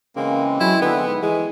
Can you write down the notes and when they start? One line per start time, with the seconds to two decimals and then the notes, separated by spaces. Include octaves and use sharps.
0.16 C#3 E3 G#3 A#3 C4
0.60 F#3 E4
0.81 D3 B3
1.07 G#2
1.22 E3 G#3